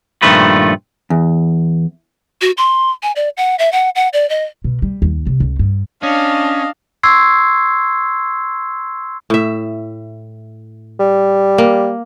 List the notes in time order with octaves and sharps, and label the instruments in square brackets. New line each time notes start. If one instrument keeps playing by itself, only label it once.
[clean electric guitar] G2 A#2 D#3 F3 A3 B4
[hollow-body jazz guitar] E2
[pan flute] F#4
C6
G#5
D5
F#5
E5
F#5
F#5
D5
D#5
[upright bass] B2
G3
D#2
C3
C#2
G2
[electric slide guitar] C#4 [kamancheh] D4 [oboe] D#5 [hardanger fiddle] F5
[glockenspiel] C6 C#6 E6 G#6 C7
[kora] A2 E5
[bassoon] G3
[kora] A#3